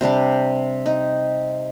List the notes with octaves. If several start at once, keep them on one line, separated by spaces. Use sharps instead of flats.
C3 G3 D4 G4
D#4